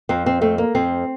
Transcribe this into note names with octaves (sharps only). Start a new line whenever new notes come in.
F2 C4
C4
A3 C4
A#3
F2 C4